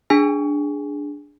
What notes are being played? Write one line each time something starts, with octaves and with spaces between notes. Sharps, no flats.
D4 G#4 G#5